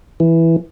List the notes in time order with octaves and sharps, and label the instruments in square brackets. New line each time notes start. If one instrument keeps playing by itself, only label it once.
[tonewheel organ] E3